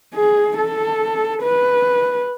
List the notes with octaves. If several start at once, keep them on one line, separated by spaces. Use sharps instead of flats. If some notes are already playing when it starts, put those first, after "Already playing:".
G#4
A4
B4